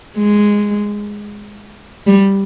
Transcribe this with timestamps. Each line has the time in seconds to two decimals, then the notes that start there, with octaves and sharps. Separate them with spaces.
0.18 G#3
2.07 G3